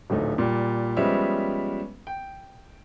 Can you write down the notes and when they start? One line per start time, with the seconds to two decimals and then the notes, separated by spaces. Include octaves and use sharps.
0.10 D1 A#1 A3 D#4
0.38 A#2 G3
0.97 F3 G3 G#3 B3 C#4 E5
2.07 G5